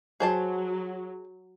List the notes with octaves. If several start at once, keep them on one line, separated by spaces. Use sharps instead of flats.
F#3 G#4 C5 A5